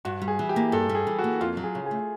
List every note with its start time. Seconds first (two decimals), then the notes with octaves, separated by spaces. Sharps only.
0.05 G2 F#4
0.22 G3
0.28 G#4
0.39 E3
0.49 G4
0.56 A#3
0.72 G2 A4
0.89 G3
0.95 G#4
1.07 E3
1.19 F#4
1.24 A#3
1.41 F2 F4
1.57 F#3
1.64 G#4
1.75 C#3
1.86 G#4
1.91 A3